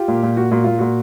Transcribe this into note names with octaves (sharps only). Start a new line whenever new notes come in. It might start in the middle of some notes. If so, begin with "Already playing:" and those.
Already playing: F4 G4
A#2
A#2
A#2 F#4
A#2 F#4
A#2 F4
A#2 F#4